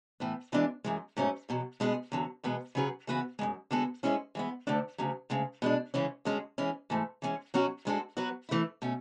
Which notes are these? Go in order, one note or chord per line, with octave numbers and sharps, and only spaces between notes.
A2 E3 B3
F#2 E3 G#3 B3 D4
F#2 E3 G#3
G#2 F#3 A3 C#4
E2 B2 F#3
B2 G#3 B3 D4 G#4
E2 D3 F#3
E2 B2 G#3 B3
C#3 F#3 C#4 G#4 B4
C#3 E3 B3 F#4 B4
F#2 C#3 G#3
D3 G#3 B3 F#4 A4
G#2 G#3 C#4 E4 G#4
E3 G#3 B3
D2 D3 A3 D4
D2 C#3 F#3
D2 C#3 G#3
B2 G#3 D4
C#3 E3 G#3 C#4
D3 G#3 C#4 F#4
E3 G#3 C#4 E4
G#2 E3 A3
E3 G#3 C#4
B2 F#3 C#4 F#4
G#2 G#3 D4 F#4 A4
F#3 B3 F#4 B4
E3 A3 E4
B2 A3 C#4